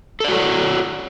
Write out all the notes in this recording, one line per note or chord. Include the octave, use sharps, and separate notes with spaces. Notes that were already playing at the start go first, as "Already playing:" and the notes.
F#4 A4 C#5 D5